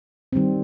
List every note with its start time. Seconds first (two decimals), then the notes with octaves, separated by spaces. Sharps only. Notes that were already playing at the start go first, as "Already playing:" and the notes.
0.33 D#3 G3 C4